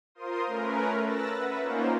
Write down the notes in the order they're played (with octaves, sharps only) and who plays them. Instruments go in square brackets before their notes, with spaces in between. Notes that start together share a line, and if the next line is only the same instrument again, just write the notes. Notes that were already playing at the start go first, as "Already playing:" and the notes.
[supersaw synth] F4 A#4 C5 C6 D#6
A3 C#4 A#4 B4
E6 F#6 A6 A#6
B4 E5 F#5
A#3 C#4 D#4 F4 A#4 C5